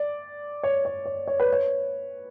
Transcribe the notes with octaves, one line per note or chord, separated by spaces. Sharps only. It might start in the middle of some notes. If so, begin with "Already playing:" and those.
Already playing: D5
C#5
C#5
C#5
C#5
B4
C#5